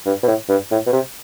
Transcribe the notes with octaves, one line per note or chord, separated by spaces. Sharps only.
G2
B2
A2
G2
A2
B2
C3